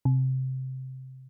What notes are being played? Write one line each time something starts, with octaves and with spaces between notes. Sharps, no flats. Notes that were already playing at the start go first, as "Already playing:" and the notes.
C3